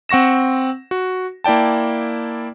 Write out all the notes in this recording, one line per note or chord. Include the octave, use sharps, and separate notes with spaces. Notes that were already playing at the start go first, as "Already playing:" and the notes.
C4 F#5 C#6 A#6 E7
F#4
A#3 E4 D5 G5 A5